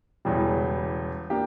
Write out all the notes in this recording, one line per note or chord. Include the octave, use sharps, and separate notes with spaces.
E1 E2 C#3 G3
A#3 D4 G4